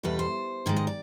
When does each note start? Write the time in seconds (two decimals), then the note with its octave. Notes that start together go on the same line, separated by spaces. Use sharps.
0.03 E2 B2 G3 B4
0.19 C5
0.66 G#2 D#3 G#3 D5
0.76 D#5
0.87 D5